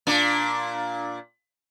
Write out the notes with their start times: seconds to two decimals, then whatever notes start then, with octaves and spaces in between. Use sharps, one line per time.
0.07 A#2 D4